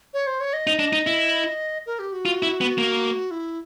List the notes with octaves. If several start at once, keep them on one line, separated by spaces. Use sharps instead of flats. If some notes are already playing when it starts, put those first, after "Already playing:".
C#5
C5
C#5
D#5
D#4
D4
D#4
E4
A#4
G4
F#4
F4
E4
B3
A#3
E4